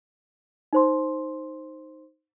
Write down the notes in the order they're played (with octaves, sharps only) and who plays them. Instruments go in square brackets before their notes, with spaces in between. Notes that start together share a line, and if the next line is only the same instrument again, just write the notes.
[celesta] D#4 C5 C6